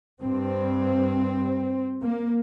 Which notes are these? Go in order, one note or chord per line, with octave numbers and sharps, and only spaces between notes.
G2 C4
A#3